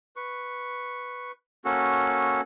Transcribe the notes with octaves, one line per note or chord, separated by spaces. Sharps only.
B4 C#6
A#3 C#4 F#4 A4